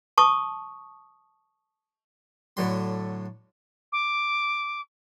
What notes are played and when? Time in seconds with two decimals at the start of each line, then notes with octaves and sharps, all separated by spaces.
0.18 A5 C#6 D#6
2.57 A2 D3 F#3 C6
3.92 D6